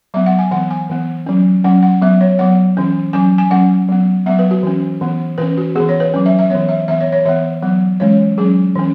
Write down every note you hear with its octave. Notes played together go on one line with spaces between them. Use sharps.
F#3 B3 E5
F#5
G#5
E3 B3 F#5
G#5
E3 B3
F#3 C#4
F#3 C#4 F#5
F#5
F#3 B3 E5
C#5
F#3 B3 F#5
E3 C#4
F#3 C#4 G#5
G#5
F#3 C#4 F#5
F#3 B3
F#3 B3 E5
B4
F#4
E3 C#4
E3 B3
E3 C#4 B4
F#4
E3 B3 G#4
C#5
B4
F#3 C#4
E5
E5
E3 B3 C#5
E5
E3 B3 E5
C#5
C#5
E3 B3 E5
F#3 B3
E3 G#3 C#4 C#5
F#3 C#4 G#4
E3 C#4